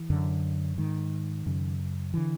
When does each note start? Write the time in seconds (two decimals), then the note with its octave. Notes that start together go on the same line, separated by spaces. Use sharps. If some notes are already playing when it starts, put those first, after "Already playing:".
Already playing: E3
0.10 F#2 D3
0.78 G#2 D#3
1.46 F#2 C#3
2.14 D3 E3